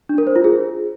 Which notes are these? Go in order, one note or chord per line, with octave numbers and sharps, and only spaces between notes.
D4
A#4
C5
F4
G#4